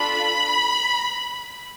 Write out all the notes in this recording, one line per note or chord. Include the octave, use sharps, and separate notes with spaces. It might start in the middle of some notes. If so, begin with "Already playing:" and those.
Already playing: D4 F4 A4 B5